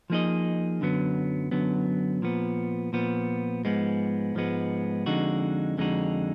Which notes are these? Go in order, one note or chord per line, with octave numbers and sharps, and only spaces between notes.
F3 A#3 D#4 G#4 D#5
F#2 D3 F#3 B3
F#2 D3 F#3 B3
A#2 F3 B3
A#2 F3 B3
G#2 F3 G#3 B3
G#2 F3 G#3 B3
F2 D3 G#3 D#4 F#4
F2 D3 G#3 D#4 F#4